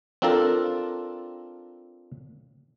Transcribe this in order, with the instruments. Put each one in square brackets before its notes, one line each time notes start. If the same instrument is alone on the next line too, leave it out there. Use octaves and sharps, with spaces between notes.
[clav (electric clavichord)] C4 D4 F4 A4 A#4